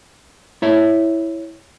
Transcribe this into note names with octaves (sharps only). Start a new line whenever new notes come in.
E4 C#5 E5